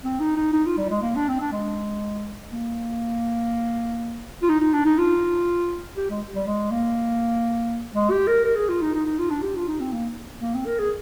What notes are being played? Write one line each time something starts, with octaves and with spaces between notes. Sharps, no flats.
C4
D#4
D#4
D#4
F4
G3
G#3
A#3
D4
C4
D4
G#3
A#3
F4
D#4
D#4
D4
D#4
F4
G4
G#3
G3
G#3
A#3
G#3
G4
A#4
A#4
G#4
F4
D#4
D#4
D#4
F4
D4
G4
F4
D#4
C4
A#3
A#3
C4
A#4
G#4